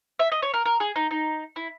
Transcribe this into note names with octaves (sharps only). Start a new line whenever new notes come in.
E5
D#5
C#5
A#4
A#4
G#4
D#4
D#4
E4